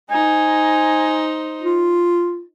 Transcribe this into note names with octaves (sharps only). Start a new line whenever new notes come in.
D#4 C5 G#5
F4